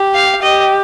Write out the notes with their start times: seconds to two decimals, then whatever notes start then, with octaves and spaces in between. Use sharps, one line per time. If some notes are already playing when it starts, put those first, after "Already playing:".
Already playing: G4
0.15 F5
0.42 G4 D#5